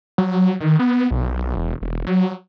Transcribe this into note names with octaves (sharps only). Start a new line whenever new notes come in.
F#3
D#3
B3
B1
E1
E1
F#3